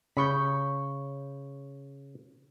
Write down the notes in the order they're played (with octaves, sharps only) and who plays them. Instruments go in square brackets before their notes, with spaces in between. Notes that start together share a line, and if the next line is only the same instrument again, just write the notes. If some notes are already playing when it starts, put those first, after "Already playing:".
[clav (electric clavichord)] C#3 [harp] B5 C#6 G6